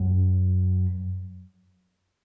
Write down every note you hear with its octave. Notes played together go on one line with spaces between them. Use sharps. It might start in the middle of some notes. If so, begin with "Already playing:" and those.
Already playing: F#2